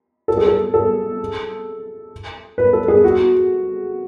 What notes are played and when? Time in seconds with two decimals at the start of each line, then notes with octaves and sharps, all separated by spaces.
0.28 A4
0.37 G#4
0.46 A4
0.74 A4
2.58 B4
2.73 A4
2.88 G#4
3.04 F#4